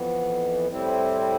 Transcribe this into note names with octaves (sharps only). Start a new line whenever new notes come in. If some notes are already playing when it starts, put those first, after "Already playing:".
Already playing: F2 E3 B3
A2 G3 C4 E4